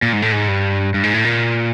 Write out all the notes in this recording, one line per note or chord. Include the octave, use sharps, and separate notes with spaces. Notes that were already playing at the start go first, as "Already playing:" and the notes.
A#2
G#2
A2
G#2
G2
G2
G#2
A2
A#2